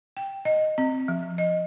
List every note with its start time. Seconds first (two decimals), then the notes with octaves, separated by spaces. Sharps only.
0.17 G5
0.45 D#5
0.78 C4
1.08 F3
1.38 D#5